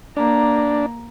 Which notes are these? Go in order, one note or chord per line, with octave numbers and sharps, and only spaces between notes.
A#3 D4 A#5